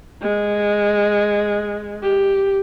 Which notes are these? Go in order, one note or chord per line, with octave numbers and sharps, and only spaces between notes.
G#3
G4